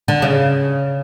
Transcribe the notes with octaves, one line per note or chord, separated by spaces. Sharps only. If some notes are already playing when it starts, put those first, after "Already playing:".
D3
C#3